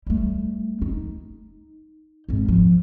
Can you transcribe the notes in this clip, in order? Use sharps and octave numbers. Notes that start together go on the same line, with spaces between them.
G3 A3
D#4
F2 G#2
F3